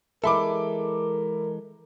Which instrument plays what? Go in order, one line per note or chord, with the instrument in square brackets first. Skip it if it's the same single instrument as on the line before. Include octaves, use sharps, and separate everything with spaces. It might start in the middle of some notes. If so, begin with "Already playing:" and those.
[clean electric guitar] E3 G#3 A4 [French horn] A#4 [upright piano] E5 B5 D6